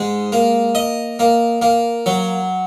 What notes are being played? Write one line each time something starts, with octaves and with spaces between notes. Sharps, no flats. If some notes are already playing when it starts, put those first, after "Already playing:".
Already playing: G#2 G#3
A#3
D#5
A#3
A#3
F#3